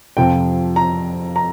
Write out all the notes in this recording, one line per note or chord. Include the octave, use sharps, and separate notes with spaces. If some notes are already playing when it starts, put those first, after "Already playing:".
F2 C3 F3 G5
A#5
A#5